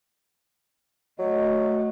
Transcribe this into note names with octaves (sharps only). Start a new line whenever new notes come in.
F#3 A3 D#5